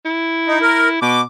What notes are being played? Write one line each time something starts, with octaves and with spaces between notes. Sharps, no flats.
E4
D#4
A#4
B2 D6